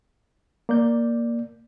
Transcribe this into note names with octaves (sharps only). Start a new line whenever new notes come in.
A#3 D5 G6